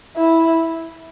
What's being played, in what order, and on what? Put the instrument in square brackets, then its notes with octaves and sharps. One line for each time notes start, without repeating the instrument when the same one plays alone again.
[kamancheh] E4